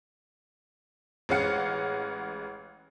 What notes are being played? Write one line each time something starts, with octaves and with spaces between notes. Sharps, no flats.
A1 G#3 C#4 F5 F#5 C#7